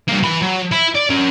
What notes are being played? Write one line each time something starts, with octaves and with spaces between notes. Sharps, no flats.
G2 A#3
E3 B5
F#3
E4
D5
C#4 A#4